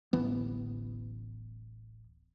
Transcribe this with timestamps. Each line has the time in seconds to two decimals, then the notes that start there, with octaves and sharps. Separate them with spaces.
0.13 D1 A1 E3 B3